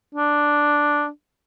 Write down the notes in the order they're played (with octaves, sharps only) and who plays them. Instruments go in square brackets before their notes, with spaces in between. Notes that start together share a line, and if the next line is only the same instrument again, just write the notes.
[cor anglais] D4